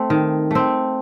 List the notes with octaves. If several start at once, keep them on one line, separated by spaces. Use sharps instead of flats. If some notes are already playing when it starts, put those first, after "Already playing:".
Already playing: A3 C4
D#3
A3 C4